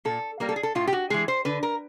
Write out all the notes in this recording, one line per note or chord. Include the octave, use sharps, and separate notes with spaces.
A#2 A4
G3 A#3 A#4
A4
G#4
A4
A2 F4
G4
F#4
E3 G#3 G#4
C5
D3 B4
A#4